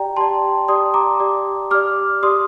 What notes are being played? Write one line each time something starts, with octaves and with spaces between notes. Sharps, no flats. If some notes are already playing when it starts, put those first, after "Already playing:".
Already playing: G4 D5 G5 A#5
G4 D5 A5 C6
G4 D5 C6 D#6
A#5 D6
G4 D5
G4 D5 D6 F6
G4 D5 C6 D#6